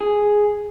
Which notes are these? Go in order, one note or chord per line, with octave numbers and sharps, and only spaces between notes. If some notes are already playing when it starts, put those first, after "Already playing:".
G#4